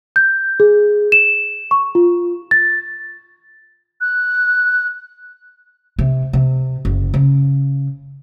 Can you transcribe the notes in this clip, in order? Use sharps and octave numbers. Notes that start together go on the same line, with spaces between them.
G6
G#4
E7
C#6
F4
A6
F#6
C3
C3
F#1
C#3